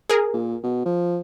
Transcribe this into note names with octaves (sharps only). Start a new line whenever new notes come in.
G#4 A#4
A#2
B2
F3